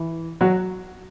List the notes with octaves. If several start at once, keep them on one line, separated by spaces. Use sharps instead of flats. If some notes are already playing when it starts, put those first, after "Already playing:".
Already playing: E3
F#3 F#4